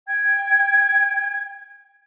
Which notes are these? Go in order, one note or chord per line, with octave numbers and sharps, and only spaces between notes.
G5 G#6